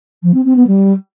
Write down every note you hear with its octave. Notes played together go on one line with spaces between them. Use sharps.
F3
C4
C4
B3
G3